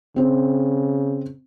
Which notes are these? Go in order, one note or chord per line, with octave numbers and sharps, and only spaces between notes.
C#3 C4 C5